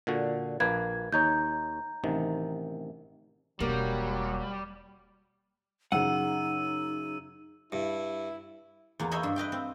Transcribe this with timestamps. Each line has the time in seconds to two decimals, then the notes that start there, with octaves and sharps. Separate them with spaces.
0.07 A#2 D3 F#4
0.60 A#1 A#3 B4 G#6
1.13 D#2 D#4 C#5 A#5 G6
2.04 A1 C3 D#3
3.60 E1 F#3 G3 A#3
5.92 F#2 C#3 D#4 F#5 E6 D#7
7.72 G2 E4
9.00 E2 A#3
9.11 C5 C#5 D#5 E5 G#5 B5
9.23 G2
9.36 B4 D#5 F5 G5
9.52 C4